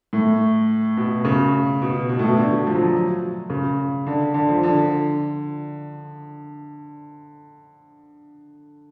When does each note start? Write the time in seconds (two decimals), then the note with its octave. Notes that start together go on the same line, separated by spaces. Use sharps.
0.13 A2
0.97 B2
1.25 C#3
1.82 B2
2.09 B2
2.19 A2
2.29 B2
2.38 D3
2.66 F3
2.75 F#3
3.50 C#3
4.07 D3
4.34 D3
4.48 F3
4.63 D3